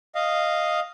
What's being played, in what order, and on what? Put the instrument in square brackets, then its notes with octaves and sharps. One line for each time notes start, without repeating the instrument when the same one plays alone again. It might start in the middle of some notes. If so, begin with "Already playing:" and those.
[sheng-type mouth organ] D#5 F5